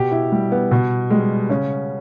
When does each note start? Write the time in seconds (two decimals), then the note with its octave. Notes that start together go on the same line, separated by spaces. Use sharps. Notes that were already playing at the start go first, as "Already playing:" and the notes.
Already playing: B2 G4
0.12 E4
0.32 G3
0.52 B3
0.71 B2
1.10 G3 G#3
1.49 C#3 C#4